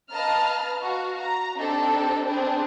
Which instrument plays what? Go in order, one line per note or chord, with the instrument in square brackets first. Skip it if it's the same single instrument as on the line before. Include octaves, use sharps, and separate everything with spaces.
[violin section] B4 D#5 F5 A5 A#5 F6
F#4 F5
A#5
C4 D4 D#4 G4 A4
C4 D4 G#4 B4 C5